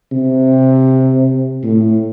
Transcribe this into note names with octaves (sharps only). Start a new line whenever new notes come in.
C3
A2